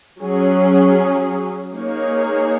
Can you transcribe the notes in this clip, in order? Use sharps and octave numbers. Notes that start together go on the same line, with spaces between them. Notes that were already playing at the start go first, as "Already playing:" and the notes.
F#3 C#4 G#4
A#3 D#4 G#4 C#5